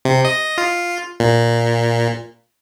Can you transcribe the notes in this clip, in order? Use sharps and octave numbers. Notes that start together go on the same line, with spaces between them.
C3
D#5
F4
A#2